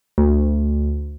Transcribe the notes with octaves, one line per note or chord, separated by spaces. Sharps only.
D2